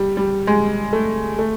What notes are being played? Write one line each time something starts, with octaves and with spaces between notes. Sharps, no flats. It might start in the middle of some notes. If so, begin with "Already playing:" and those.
Already playing: G3
G3
G#3
A3
A3